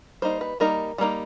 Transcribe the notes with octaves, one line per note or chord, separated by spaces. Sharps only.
G3 A#3 D#4 C5
B4
G3 A#3 D#4 A#4
G3 A#3 D#4